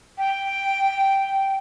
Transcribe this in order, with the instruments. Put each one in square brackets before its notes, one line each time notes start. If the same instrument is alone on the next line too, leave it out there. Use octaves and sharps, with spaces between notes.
[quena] G5